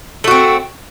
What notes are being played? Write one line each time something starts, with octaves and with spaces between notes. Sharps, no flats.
A3 C4 F#4